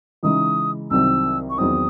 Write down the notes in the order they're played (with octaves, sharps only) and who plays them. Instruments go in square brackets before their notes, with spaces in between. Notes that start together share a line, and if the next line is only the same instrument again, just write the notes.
[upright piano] C#3 E3 G#3 D#4 [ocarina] D#6
[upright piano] C2 C3 D#3 F#3 C4 [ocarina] E6
[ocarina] C#6
[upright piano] E2 D#3 F#3 C4 D#4 [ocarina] D#6